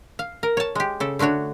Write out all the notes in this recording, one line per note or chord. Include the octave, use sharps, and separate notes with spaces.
F5
A#4
C#5 A5
G#3 G4
C#3 A4
D3 A3 D4 F#4 C#5